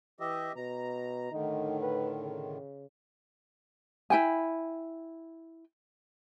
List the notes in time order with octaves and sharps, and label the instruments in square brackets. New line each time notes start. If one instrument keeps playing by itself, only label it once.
[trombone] E3 [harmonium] G4 D#5 E5
[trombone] B2 [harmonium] A#5
[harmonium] A2 D3 D#3 [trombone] D#4
[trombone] B4
C#3
[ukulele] E4 G5 G#5